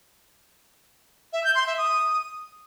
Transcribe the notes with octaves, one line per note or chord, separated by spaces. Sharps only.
E5
G6
C6
E5
D#6